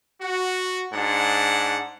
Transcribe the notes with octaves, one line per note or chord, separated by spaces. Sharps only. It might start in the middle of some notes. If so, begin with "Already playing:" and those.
F#4
G#2 D4 F#5